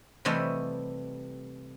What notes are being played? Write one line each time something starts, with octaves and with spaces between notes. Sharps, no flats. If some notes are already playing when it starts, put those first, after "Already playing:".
C3 E3 G3 A3 D#5